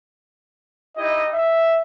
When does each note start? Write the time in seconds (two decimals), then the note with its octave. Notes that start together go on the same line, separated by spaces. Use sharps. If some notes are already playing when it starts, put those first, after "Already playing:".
0.98 D#4 E4 G4 D#5
1.34 E5